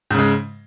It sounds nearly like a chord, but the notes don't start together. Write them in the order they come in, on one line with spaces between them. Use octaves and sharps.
G#2 C#3 G#3